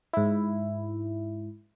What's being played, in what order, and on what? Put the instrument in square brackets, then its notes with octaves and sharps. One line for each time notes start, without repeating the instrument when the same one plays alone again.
[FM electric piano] G#2 E4